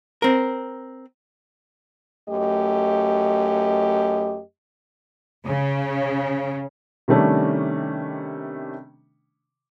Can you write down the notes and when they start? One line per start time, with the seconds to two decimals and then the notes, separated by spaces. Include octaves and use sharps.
0.22 C4 A#4
2.29 F#2 A3 G4 D#5
5.46 C#3
7.08 C3 D#3 G3 A3 C#4 D4